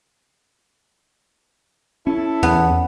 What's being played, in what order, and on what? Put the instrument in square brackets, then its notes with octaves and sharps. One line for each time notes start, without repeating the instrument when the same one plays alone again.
[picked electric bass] C#4 [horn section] E4 A4
[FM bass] E2 [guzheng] B3